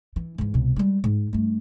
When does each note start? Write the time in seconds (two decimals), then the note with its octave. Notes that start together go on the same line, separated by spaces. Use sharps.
0.16 E3
0.38 G#2 E3
0.54 C2 B2
0.76 G3 G#3
1.04 G#2
1.33 G2 A3